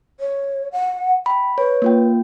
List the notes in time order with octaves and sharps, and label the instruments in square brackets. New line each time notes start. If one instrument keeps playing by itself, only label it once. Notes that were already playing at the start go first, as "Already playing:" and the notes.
[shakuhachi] C#5
F#5
[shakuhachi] G5 [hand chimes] B5
[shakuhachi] B4 [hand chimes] C#5
[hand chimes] A#3 F4 G5